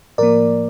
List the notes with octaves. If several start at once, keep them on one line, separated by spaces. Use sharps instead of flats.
A2 F3 A#3 A#4 D5